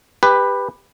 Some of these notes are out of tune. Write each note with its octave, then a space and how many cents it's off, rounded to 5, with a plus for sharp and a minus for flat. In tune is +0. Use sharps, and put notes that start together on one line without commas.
G4 +20 B4 +0